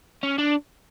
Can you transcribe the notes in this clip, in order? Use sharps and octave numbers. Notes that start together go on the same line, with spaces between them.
C#4
D4